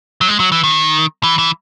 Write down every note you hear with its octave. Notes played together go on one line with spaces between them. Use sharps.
F#3
G#3
F#3
E3
D#3
E3
E3